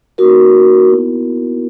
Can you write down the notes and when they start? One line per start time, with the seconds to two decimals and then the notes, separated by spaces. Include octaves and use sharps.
0.18 A#3 D#4 F#4 A#4
0.89 B3 E4